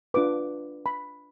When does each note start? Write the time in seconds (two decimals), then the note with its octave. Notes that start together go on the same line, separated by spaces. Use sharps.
0.14 D4 F4 B4 D6
0.86 B5